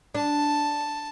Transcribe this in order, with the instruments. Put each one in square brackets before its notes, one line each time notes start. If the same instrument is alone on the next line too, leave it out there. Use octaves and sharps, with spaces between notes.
[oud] D4 [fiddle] A5